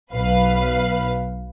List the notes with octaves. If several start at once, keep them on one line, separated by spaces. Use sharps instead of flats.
B1 B4 F5 B5